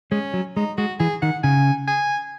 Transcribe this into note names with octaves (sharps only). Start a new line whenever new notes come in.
G#3 C#4
F#3
G#3 D#4
G#3 F#4
E3 G#4
D#3 F#5
C#3 G#5
G#5